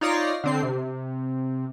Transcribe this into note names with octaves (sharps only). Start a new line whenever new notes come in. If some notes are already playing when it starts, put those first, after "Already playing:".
D#4 F4 C#5 D5 A#6 C7
D3 C4 C7
C3